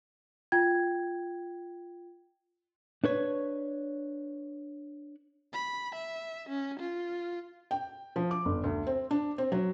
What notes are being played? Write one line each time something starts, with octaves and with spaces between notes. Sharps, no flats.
F4 G5 G#6
D4 B4 C#5
B5
E5
C#4
F4
G5
F3
D6
G1
D2
C4
D4
C4
F#3